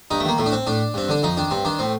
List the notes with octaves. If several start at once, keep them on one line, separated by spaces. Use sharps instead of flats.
G2 D#4
A3
D#3 A#3
A2 A3
D4
C4
A2 D4
G2 C4
D3 D4
F2 D#4
D#3 D4
G2 C4
D#3 D4
A2 C4